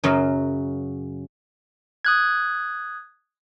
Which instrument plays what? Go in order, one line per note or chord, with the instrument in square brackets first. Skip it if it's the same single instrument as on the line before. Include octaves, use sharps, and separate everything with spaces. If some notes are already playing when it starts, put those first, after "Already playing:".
[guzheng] F#2 C#3 F#3
[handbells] D#6 F#6 G#6